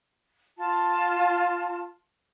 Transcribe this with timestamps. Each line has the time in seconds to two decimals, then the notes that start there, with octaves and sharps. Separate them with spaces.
0.57 F4 A5